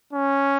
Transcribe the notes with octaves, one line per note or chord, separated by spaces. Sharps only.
C#4